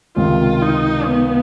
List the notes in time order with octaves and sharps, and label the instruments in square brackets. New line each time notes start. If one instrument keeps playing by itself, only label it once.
[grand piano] C#2 C3 D#3 [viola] F4
[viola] D#4
B3